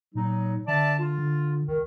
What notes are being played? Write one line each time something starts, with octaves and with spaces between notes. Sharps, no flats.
A#2 F#3 D#4
D3 D5 E5 A5
F4
D3
C#2 D#3